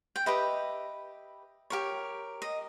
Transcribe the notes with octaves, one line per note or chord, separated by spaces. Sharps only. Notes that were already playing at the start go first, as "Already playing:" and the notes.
G5
G4 B4 D#5 E5
G4 A#4 C#5
D#5